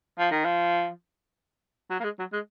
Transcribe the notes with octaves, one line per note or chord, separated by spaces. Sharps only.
F3
D#3
F3
F#3
A#3
G#3
F#3
G#3